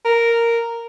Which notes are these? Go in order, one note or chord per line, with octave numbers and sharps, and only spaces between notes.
A#4